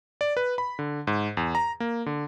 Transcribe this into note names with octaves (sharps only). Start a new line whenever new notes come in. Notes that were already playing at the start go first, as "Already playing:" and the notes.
D5
B4
B5
D3
G#2
E2
A#5
A#3
D3